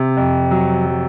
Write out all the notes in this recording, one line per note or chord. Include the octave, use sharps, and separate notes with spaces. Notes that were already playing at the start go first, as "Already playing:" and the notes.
Already playing: C3
F2
F#3
F#3